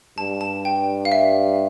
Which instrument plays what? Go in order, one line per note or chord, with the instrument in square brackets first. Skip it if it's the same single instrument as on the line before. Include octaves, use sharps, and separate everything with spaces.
[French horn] G2 [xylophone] A5
[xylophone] A5
G5
F5
E5